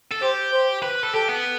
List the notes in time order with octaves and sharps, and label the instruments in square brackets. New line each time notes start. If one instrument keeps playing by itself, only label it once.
[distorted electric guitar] A4
[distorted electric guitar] G4 [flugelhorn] C5
[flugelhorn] C5
[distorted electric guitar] B4
A4
[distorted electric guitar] G4 [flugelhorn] A4
[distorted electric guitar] B3